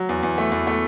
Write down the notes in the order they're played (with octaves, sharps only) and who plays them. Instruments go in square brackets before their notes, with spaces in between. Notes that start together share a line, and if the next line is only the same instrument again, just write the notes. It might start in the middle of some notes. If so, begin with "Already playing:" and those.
Already playing: [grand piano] F#3
E2
E2
A3
E2
A3